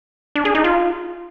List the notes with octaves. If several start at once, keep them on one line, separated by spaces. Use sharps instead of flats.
D4
G#4
D#4
F4